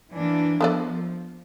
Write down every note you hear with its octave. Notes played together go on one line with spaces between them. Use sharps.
E3 A#3 D4
F3 B3 A4 D5